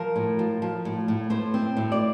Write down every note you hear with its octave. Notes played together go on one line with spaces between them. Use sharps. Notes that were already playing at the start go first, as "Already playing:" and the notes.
Already playing: F3 A#4
A2
F3
F3
A2
A2
A2 C5
C4
A2
D5